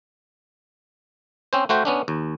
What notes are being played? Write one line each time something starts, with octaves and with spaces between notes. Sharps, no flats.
C4 C#4 C5
A3 F#4 C5 G5
B3 C#4 D4
D#2